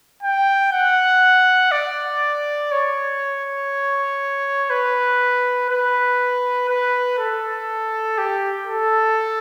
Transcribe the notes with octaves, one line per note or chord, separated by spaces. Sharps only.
G5
F#5
D5
C#5
B4
B4
B4
A4
G4
A4